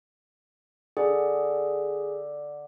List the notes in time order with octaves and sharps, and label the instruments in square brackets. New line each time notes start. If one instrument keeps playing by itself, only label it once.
[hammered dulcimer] D3 [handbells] G#4